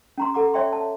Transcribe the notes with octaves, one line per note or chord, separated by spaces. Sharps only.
C#4 A#5 C6
A4 F#5 A#5 D6
C#5 D5 E5 G5 C6
A5